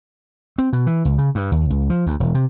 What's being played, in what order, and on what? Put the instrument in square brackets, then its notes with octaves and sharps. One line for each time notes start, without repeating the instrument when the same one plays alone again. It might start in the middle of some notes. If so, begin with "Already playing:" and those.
[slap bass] C4
B2
E3
C#2
C#3
G2
D#2
C#2
F3
D2
E1
C3